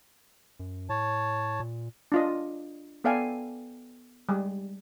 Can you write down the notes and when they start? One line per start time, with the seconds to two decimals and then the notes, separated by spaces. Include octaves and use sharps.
0.60 F#2
0.89 A2 C#5 A5
1.60 A#2
2.12 D4 F4 D#5
3.04 B3 A4 D5 F5 G5 G#5
4.29 G3 G#3